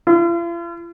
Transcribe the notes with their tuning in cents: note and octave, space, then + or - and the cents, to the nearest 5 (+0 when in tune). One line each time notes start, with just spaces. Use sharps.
F4 -45